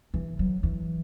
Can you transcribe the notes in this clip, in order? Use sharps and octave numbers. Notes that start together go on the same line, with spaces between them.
E3
F#3
E3